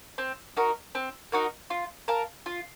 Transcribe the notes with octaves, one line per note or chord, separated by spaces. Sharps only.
C4
D#4 F#4 A#4
C4
D#4 F#4 A#4
F4
A#4 F5 A5
F4